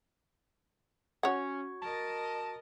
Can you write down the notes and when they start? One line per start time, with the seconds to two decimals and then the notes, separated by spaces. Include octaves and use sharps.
1.23 C#4 F#4 C#5 F#5 C#6 G#6
1.82 A#4 D#5 A5